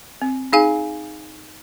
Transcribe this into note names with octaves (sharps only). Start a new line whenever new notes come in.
C4
D#4 G#4 F5 G#5